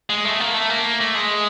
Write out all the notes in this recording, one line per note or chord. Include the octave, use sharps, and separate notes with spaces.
G#3
A3
A#3
A3
A#3
A3
G#3